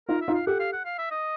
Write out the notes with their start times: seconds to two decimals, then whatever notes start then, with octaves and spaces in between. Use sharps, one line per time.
0.08 D#4 F4 A#4
0.21 E5
0.28 D#4 F4
0.34 F5
0.46 G4 A4 F#5
0.59 F5
0.72 F#5
0.85 F5
0.98 E5
1.11 D#5